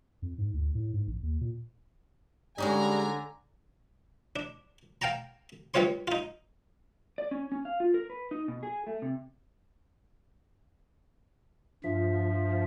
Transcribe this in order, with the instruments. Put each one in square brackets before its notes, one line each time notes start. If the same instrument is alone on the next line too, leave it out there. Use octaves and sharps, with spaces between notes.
[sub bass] F2
G#2
D2
A2
G#2
A1
D#2
A#2
[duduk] D3 [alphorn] G3 [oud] G#3 C#4 D#4 [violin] G#5 A#5
[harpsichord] D4
F5 G5 A5 A#5
G2 F3 G3 F4 C#5 C6
D#4 F4
[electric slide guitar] D5
C#4
C#4
F5
F4
A#4
B4
D#4
B2
G#4
A3
C3
[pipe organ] G2 E5 [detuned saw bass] F3